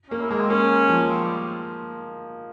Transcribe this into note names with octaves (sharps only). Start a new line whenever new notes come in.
A#3 C#4
E4
G#3 A#3
C4
A#3 C#4
F3
C4
G3